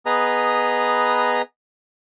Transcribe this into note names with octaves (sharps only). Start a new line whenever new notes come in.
B3 G#4 B4 D#5 A#5